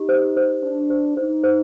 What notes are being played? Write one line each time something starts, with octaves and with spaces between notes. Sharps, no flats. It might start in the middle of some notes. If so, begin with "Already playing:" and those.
Already playing: D#4 G4
C5
C5
D4 C5
C5
D#4 C5
C5